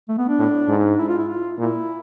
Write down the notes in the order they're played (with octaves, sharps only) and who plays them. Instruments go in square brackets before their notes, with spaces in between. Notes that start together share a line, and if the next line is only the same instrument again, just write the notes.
[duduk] A3
B3
D4
[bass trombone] A2
G#2
[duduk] E4
F4
E4
F4
[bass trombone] A#2 [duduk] E4